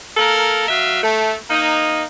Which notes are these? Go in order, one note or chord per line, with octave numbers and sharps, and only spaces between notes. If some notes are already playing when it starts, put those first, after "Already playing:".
A#3 A4 A#4
F#3 E5 F5
A3
A#3 D#4